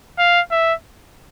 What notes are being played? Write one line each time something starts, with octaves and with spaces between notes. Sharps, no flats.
F5
E5